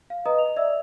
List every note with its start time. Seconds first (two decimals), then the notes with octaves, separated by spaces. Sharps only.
0.10 F5
0.26 B4 D#5 A#5 D#6
0.38 F7
0.57 D5 E5 E6